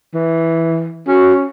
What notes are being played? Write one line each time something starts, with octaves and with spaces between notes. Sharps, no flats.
E3
C#4 F#4